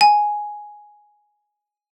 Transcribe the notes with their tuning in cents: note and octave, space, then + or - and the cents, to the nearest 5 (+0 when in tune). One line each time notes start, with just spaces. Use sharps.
G#5 +5